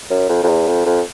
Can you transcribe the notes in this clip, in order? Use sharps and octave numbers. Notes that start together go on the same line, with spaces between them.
F#2
F2
F2
E2
F2
F2